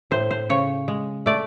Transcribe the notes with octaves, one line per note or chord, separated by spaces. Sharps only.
A2 C5
C5
C#3 C#5
G#3
A3 D5